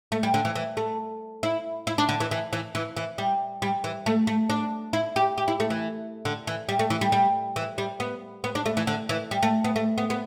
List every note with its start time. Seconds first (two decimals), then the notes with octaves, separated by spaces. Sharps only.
0.12 A3
0.23 G3
0.34 D3
0.45 E3
0.56 E3
0.77 A3
1.43 E4
1.87 E4
1.98 D4
2.09 D3
2.20 E3
2.31 E3
2.53 E3
2.75 E3
2.97 E3
3.18 G3
3.62 G3
3.84 E3
4.06 A3
4.27 A3
4.50 D4
4.93 E4
5.16 G4
5.38 G4
5.48 E4
5.60 A3
5.70 E3
6.25 D3
6.47 E3
6.69 G3
6.79 A3
6.90 E3
7.01 G3
7.12 G3
7.56 E3
7.78 G3
8.00 B3
8.44 B3
8.55 D4
8.66 A3
8.77 E3
8.87 D3
9.09 E3
9.31 G3
9.43 A3
9.64 B3
9.76 A3
9.98 B3
10.10 B3